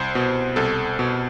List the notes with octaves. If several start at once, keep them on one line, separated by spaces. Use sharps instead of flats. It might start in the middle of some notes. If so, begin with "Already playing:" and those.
Already playing: C2 C5
B2
C2 A4
B2